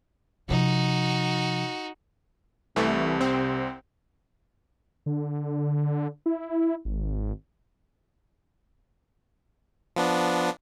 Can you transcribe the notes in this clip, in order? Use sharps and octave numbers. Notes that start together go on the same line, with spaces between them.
C3 F3 D#4 F#4
C2 C3 E3 A3
C4
D3
E4
G#1
F3 B3 D4